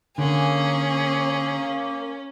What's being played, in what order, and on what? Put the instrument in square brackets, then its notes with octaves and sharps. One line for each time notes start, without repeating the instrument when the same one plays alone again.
[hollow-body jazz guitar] D3 [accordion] A#3 [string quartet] C#4 [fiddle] G#4